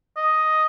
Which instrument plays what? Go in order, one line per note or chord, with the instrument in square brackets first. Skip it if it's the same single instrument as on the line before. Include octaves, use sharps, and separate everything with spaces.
[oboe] D#5